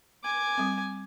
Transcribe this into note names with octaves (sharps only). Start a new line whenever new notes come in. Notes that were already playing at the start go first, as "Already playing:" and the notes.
G#5 D6
G3 C4